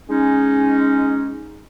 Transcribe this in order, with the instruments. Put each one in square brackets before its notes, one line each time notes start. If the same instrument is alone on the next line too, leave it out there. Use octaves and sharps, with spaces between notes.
[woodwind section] G#3 C#4 D#4